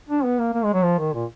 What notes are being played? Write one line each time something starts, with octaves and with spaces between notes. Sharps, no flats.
D4
B3
A#3
A#3
G#3
F#3
F3
D#3
A#2